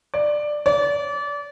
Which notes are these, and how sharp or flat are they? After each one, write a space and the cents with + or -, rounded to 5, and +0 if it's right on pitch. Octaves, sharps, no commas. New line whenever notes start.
D5 +10
D5 -30